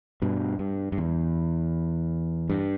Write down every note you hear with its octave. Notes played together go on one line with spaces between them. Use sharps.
G2 B2
G2
G2
E2
G2